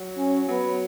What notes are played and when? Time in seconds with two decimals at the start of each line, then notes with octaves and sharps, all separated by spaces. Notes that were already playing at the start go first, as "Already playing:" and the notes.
Already playing: F#3
0.17 C#4
0.48 F#3 B3